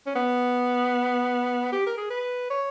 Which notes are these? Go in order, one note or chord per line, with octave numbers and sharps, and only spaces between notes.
C#4
B3
G4
A#4
G#4
B4
C#5